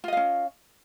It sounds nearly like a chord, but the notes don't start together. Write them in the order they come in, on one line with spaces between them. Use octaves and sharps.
F4 D#5 F5 C#4